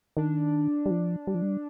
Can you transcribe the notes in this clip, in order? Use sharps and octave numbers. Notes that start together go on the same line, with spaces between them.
D#3 D4
G3
F3
G3
F3
G3